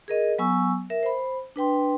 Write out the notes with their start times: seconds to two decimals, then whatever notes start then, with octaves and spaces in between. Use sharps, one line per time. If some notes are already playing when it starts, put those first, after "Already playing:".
0.08 G#4 A#4 D#5
0.38 F#3 B3 G#5 C#6 E6
0.90 A#4 E5
1.03 C5 B5
1.56 D4 B4 G5 C6